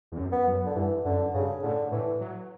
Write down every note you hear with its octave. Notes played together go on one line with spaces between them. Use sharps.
E2
F#2
B3
F#2
D3
G2 E3
F#2 D3
G2 C#3
A2 D3
A2 E3
F#3